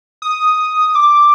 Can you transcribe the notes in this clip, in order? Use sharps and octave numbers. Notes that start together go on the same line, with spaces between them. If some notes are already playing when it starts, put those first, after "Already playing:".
D#6
D6